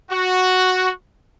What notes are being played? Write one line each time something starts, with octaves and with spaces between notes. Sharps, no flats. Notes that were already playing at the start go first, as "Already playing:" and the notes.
F#4